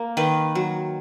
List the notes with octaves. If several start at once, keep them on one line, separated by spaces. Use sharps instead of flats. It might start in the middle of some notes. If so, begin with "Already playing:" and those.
Already playing: A#3
D#3 B4
F#3